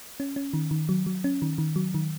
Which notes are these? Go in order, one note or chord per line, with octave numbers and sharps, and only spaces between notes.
C#4
C#4
D#3
D#3
F#3
F#3
C#4
D#3
D#3
F#3
D#3